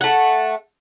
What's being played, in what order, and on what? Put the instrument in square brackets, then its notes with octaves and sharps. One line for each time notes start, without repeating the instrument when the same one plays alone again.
[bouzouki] A3 F#5